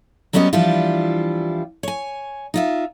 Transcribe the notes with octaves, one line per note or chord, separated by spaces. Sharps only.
F#3 G3 B3 C#4 C5 D#5
E3 F3 G3 D4 E4 F4
C#5 G#5
D#4 F4 E5